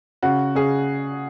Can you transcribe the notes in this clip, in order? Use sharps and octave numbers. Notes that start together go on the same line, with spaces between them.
C#3 F#4
C#3 G#4